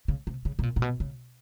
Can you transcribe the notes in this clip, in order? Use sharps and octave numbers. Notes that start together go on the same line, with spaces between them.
C#3
C3
C#3
B2
A#2
A#2
B2
C#3